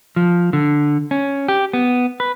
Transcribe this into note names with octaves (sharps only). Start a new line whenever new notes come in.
F3
D3
C#4
G4
B3
B4